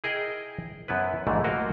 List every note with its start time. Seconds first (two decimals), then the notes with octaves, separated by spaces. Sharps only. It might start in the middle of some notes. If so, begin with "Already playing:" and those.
0.04 E4 G#4 A#4 D#5 G5
0.88 F#2 B3 E4 B4
1.27 A#1 F2 G#2 D3 E3 A3
1.44 A3 A#3 F#4 A#4 D#5 F5